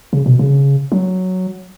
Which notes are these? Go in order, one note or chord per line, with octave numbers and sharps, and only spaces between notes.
C#3
B2
C#3
F#3